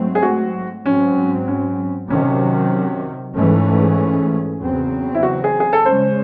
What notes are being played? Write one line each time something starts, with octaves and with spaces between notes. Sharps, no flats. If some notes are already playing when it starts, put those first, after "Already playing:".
Already playing: G#2 F#3 A3 C4
G#4
F#4
G#2 F#3 C4 C#4
C#4
C3 D#3 F#3 C#4
G#2 E3 A3 C#4 A4
A4
A4
G#4
E2 C#3 F#3 C4
E4
F#4
G#4
G#4
A4
C#3 G#3 C#4 C5